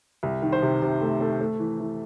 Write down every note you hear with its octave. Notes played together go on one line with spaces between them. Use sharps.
C2
D#3
C5
C3
C3
A3
A3
A3
E3
E3